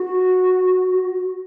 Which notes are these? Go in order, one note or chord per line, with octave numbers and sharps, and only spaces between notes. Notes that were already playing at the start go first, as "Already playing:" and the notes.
Already playing: F#4